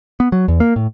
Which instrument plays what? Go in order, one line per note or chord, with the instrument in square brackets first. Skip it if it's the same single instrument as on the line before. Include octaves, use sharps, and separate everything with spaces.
[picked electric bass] B3
F#3
E2
A#3
A2